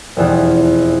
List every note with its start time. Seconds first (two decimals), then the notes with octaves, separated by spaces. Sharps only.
0.17 F1 E2 B2